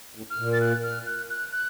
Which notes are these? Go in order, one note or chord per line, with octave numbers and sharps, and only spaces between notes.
A2
F6
A#2
A6
F#6
F6
F#6
F#6
F#6